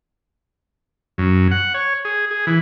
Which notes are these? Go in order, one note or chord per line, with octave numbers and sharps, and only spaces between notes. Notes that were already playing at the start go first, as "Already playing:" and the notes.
F#2
F#5
C#5
G#4
G#4
E3